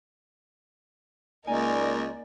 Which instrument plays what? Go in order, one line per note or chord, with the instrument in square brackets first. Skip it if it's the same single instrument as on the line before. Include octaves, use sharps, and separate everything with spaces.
[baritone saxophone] C#2 [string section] A#3 D#4 A#4 [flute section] D5 [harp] G#5